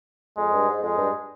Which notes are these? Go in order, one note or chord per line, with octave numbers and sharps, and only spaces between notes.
F2 G#3
G2
G#2
F2 G#3
G2